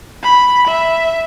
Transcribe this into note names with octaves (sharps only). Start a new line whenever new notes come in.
B5
E5